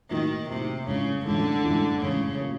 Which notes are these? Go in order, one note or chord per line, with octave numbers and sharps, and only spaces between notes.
A2 D#3 F#3 A#3 D#4
A2 C3 F#3 A#3 D#4
A1 G2 C#3 E3 G#3
A1 G2 D3 E3 G#3
A1 G2 E3 G#3
A1 G2 C#3 E3 G#3
A2 F#3 A#3